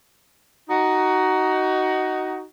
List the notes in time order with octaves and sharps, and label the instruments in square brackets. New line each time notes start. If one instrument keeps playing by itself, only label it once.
[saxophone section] D#4 F#4